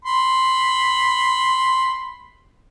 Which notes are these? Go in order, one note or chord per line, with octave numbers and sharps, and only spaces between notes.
B5 C6